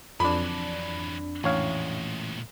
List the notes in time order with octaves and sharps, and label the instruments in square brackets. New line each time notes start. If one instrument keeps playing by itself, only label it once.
[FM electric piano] F2 D4 [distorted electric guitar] E3 F#3 [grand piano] B5
[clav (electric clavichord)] A1 C#5 F5 [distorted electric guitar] A#2 G#3